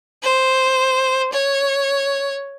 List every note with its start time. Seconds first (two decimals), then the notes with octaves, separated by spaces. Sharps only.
0.23 C5
1.33 C#5